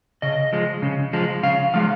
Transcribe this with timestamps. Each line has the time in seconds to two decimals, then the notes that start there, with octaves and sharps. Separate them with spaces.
0.22 C#3 D#5
0.53 F3 G#3
0.82 C#3
1.13 F3 G#3
1.43 C#3 F5
1.74 F3 G#3 F5